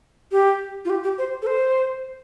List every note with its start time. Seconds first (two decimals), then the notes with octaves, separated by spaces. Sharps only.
0.32 G4
0.85 F4
0.90 G4
1.03 G4
1.18 C5
1.42 A4
1.47 C5